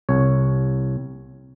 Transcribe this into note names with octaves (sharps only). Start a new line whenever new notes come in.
C2 C#5